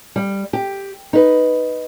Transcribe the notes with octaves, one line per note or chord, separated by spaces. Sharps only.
G3
G4
D#4 B4